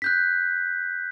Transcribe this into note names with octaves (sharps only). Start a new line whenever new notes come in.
F#6 G6 B6